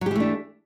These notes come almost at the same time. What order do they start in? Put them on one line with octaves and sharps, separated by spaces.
F#3 G4 E3 A3 D4